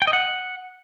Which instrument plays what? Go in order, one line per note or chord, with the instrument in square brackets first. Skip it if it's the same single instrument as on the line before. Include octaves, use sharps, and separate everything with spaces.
[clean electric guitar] G5
D#5
F#5